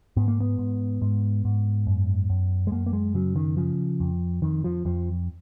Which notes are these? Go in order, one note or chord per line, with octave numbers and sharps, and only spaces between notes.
G#2 B3
A#3
B3
G#2
G#2
G#2
F#2
F#2
G#3
F#2 A#3
A#3
G#3
C#3 F#3
D#3
C#3 F3
F2
F2 D#3
F3
F2 F3